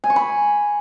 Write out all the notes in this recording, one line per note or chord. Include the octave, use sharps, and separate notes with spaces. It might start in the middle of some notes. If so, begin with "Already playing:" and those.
G#5
C#6
B5